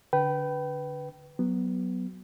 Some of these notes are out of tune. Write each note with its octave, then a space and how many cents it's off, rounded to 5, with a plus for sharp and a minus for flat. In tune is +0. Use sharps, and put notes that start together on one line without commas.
D3 -15 B4 +0 G5 -25
F#3 +10 B3 +0